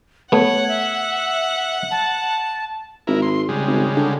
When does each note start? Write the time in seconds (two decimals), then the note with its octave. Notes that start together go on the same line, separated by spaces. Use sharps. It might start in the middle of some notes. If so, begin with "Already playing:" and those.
0.32 A3 B3 C#5 F#5
0.68 E5
1.91 A5
3.07 G#1 E4 A#4
3.22 C6
3.49 C#3 G3 G#3
3.67 G#1
3.97 D3